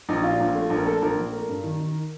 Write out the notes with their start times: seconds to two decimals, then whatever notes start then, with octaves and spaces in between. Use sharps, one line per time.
0.09 A#1 D#4
0.24 A#2 F4
0.40 A#1
0.55 A3
0.70 A#1
0.77 A#4
0.86 A3 A4
1.02 A#1 A#4
1.17 A#1
1.32 A3 A#4
1.49 G2
1.63 D#3
1.80 D#3